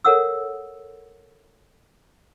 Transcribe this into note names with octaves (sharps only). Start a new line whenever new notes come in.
A4 A#4 C#5 F#5 D#6 E6